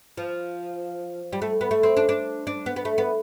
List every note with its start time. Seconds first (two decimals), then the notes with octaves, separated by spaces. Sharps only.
0.17 F3
1.33 G3
1.42 A3
1.61 B3
1.71 A3
1.83 C4
1.97 D4
2.09 D4
2.47 D4
2.66 B3
2.76 B3
2.85 A3
2.98 B3